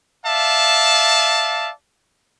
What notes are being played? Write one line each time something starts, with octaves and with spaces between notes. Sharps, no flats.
D5 E5 F5 A5